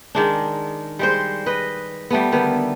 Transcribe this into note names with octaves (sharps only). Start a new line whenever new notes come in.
D#3 G#3 D4
G3 G#3 C5
B4 D#5
G3 A3 B3
D3 D#3 B3